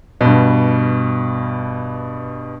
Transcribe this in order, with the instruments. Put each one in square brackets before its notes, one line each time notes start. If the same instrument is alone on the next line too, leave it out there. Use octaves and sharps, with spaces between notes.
[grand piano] G2 B2